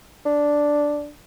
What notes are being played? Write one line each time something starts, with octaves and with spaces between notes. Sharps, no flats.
D4